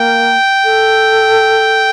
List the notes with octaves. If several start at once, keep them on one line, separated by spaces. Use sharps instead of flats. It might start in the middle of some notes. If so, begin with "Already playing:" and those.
Already playing: A#3 G5
A4